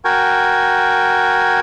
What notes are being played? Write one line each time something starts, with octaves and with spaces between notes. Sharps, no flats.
F#4 A#4 G5 G#5